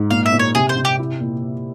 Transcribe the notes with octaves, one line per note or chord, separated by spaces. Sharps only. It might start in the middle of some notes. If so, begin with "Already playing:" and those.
Already playing: G#2
A#2 F5
E5
A#2
C#5
C3 G#4
C5
C3
G4
E4
A#2